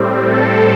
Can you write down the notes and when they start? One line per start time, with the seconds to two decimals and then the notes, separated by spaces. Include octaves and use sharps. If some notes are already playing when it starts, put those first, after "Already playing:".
Already playing: A2 G3 C4
0.31 A4